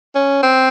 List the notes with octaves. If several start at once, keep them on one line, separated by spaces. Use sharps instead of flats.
C#4
C4